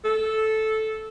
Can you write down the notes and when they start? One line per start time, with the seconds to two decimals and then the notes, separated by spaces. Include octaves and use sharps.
0.04 A4